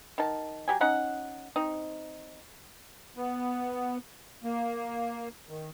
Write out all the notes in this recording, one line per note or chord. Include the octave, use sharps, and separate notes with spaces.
D#3 A5
F#3 G4 G#5
C#4 D#4 F#5
C4 D#4
B3
A#3
D#3